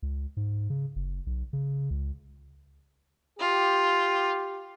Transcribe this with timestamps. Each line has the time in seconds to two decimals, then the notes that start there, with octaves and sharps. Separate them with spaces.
0.02 C#2
0.37 G#2
0.70 C#3
0.96 F#1
1.27 B1
1.53 C#3
1.90 C#2
3.39 F4 G4